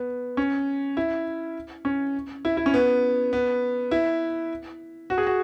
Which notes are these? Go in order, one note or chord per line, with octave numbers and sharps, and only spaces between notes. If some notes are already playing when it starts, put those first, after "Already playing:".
Already playing: B3
C#4
E4
C#4
E4
E4
C#4
B3
B3
E4
F#4
G#4
F#4